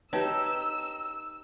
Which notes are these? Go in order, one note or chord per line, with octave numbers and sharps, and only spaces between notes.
D#4 G4 B4 C#5 G5 A5 E6